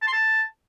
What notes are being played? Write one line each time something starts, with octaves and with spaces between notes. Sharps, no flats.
A5
C6
A5